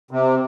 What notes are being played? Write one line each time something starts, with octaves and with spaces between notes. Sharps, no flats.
C3